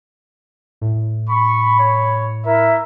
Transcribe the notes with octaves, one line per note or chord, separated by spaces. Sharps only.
A2
B5 C#6
C#5
E4 A#4 E5